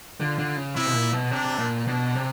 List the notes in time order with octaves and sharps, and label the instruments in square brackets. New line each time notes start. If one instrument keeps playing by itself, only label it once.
[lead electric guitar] D3 [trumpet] F4
[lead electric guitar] D3
C#3
[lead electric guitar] C3 [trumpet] E4
[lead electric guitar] B2
A#2
B2
[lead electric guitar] C3 [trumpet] D4
[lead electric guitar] A#2
[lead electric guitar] B2 [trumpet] D4
[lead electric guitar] C3